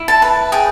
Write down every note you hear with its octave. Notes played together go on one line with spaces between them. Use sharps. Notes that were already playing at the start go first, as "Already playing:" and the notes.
Already playing: E4
A5
B4
G#4 G5